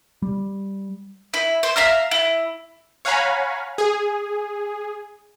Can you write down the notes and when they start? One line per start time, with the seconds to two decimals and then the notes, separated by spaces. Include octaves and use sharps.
0.22 G3
1.34 E4
1.63 C5
1.76 E5 F5 A#5 F6
2.11 E4
3.05 C#5 F5 F#5 G#5 A#5 B5
3.78 G#4